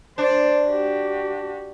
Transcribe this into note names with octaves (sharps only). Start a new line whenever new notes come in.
D4 C5 D5
F#4 G4